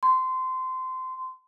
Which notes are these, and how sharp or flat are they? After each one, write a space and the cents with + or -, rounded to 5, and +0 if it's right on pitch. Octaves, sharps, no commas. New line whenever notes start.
C6 -20